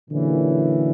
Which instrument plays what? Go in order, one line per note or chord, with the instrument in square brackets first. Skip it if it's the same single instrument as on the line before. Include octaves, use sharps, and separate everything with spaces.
[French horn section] A#2 F#3 A#3 C#4 E4 [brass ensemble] D3 E3